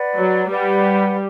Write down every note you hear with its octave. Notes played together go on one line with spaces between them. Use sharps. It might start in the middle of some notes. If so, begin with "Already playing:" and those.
Already playing: B4 D5 F#5
F#3
G3 B4 D5 F#5